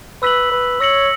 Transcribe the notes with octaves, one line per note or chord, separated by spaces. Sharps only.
B4 E6 B6 F#7
B4
C#5 E6 A#6 C#7 F#7